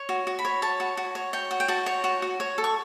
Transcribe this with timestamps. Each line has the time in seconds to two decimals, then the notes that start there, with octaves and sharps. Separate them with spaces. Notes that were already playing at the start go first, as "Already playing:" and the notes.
Already playing: C#5
0.09 F#4
0.27 F#4
0.39 B5
0.45 C#5
0.62 C#5 A5
0.80 F#4
0.97 F#4
1.15 C#5
1.33 C#5 G5
1.51 F#4
1.60 G5
1.68 F#4 A5
1.86 C#5
2.04 F#4
2.22 F#4
2.40 C#5
2.58 A4
2.64 C#6